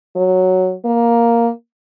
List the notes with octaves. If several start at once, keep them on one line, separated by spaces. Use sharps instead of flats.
F#3
A#3